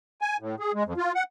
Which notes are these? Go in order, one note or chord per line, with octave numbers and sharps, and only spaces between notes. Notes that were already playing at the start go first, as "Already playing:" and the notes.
G#5
A2
G#4
G#3
F2
F4
F#5